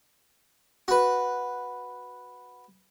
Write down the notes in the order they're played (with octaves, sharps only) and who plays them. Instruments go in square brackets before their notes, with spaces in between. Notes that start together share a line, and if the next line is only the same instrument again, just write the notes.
[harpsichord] F#4 B4